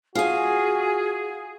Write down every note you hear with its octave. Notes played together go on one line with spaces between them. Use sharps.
F4 F#4 G#4 G#5